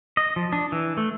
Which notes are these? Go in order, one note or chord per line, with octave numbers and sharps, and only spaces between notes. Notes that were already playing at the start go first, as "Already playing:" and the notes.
D#5
F3
D4
E3
A3